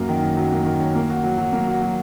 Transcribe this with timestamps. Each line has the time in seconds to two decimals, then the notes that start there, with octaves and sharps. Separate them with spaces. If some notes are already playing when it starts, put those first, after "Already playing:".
Already playing: F#2 F#3 A#3
0.09 D#3
0.23 C#4
0.37 F#3
0.52 A#3
0.66 D#3
0.80 C#4
0.95 A#3
1.10 F#4
1.24 F#3
1.38 F#3
1.53 A#3
1.67 F#4
1.82 F#3